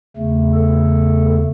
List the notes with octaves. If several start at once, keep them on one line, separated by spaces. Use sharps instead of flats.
E2 C#3 A3
A4